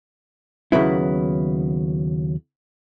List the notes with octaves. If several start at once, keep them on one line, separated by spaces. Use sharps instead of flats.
D#2 C#3 F#3 B3 E4